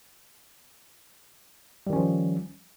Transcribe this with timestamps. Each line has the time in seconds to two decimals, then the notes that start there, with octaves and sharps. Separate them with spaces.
1.87 G3
1.90 D#3
1.93 C#4
1.96 F3